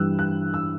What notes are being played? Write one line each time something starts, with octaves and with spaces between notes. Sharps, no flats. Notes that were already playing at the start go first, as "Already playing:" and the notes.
Already playing: G2 E3 G3 E6 F#6
F#6
E6